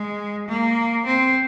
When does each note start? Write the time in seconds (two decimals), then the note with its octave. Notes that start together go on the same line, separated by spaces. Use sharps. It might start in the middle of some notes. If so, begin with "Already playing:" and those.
Already playing: G#3
0.48 A#3
1.06 C4